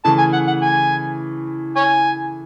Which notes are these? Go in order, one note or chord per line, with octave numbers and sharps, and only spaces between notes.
C#3 E3 A3 A5
G#5
F#5
F#5
G#5
C#5 G#5